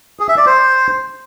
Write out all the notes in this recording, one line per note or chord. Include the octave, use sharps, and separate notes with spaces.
G#4
E5
D5
C5